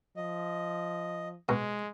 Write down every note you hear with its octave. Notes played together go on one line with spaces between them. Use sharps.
F3 D#5
B2 G#3